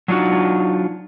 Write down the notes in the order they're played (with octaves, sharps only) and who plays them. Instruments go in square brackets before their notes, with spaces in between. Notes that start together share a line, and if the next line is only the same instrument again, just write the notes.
[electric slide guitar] F#3 D4 D#4 F4 F#4